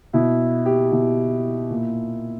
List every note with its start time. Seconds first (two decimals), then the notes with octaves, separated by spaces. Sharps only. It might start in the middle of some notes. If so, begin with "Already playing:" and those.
0.13 B2 E4
0.66 G4
0.92 B2 E4
1.70 A#2